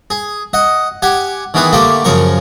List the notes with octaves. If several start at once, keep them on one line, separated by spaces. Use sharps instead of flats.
G#4
D#5 F#5
G4 F#5 G#5
D#3 E3 B3 G#4 B4
D3 A3 A#3 D4 G4 D5
F#2 C#3 F3 A#4 C#6